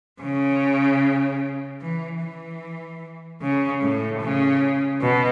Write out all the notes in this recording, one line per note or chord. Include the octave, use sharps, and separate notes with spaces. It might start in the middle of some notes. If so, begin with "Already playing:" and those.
C#3
E3
E3
C#3
A2
C#3
B2